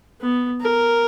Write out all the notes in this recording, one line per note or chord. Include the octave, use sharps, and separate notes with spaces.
B3
A#4